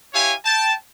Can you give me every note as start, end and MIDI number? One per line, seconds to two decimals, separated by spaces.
0.14 0.34 64
0.14 0.34 67
0.14 0.34 73
0.14 0.34 77
0.14 0.34 80
0.45 0.74 79
0.45 0.74 81